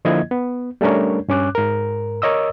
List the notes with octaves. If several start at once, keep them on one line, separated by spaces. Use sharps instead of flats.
D3 F3 A#3 E4 D#5 G#6
B3
G3 A3 C#4 D4 A#4 C#5
G2 C#4 D6 F#6
G#2 A#4
A#4 C#5 D#5 D#6 E6